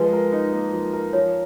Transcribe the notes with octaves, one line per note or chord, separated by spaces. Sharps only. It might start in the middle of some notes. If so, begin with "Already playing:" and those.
Already playing: F3 G#3 B4
A#4
D#4
A#3
F3
A#4
F3 C#5